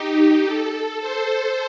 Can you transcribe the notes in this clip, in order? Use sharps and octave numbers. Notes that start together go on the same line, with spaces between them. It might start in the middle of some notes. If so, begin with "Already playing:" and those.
Already playing: D#4 G4
A4
C5